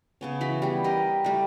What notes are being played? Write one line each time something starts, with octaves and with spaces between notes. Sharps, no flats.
C#3 B3 C#4
E3 F#4 B5
G3 B3
G4 A#4 D#5
G3 A3